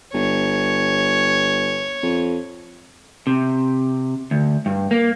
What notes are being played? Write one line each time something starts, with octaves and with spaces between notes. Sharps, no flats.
G1 C#5
F2
C3
D2
G2
A#3